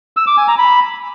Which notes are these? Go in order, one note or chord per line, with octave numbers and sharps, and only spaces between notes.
E6
D6
G#5
A#5
B5